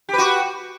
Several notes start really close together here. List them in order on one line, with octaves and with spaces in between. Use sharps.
G4 B4 F#4